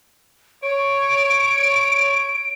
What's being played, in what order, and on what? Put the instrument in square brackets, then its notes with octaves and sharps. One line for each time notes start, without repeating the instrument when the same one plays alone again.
[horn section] C#5 [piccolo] D7